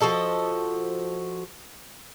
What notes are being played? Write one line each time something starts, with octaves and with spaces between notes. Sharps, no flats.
F3 F#4 A4 D#5